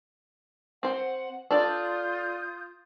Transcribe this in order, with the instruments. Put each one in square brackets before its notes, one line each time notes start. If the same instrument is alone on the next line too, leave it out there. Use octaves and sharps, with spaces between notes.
[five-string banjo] C4 C5 [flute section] F#5
[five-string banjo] D4 A4 D5 [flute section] F4 D#6 G6